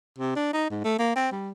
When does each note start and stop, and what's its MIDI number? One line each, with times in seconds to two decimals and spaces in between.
0.19 0.35 48
0.36 0.50 62
0.53 0.67 63
0.70 0.82 44
0.84 0.97 57
0.99 1.12 58
1.16 1.31 60
1.32 1.51 55